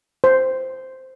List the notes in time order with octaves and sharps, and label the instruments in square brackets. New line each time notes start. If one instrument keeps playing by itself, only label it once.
[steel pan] C5